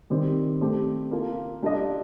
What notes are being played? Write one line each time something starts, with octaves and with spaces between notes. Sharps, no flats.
D#3 G3 C4 G4
A3 C4 G4
A#3 F4 A4
G3 D4 F4 A4 D#5